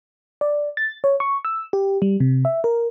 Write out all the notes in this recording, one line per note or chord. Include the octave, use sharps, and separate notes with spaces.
D5
A6
C#5
C#6
E6
G4
G3
C3
E5
A#4